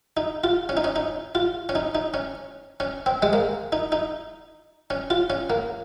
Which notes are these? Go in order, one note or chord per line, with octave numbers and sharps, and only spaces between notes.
D#4
F4
C#4
D#4
C#4
D#4
F4
C#4
D#4
D#4
C#4
C#4
C4
G#3
A#3
D#4
D#4
C#4
F4
C#4
A#3